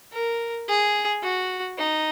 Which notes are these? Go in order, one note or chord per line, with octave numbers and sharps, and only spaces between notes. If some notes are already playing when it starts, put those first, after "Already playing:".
A#4
G#4
F#4
D#4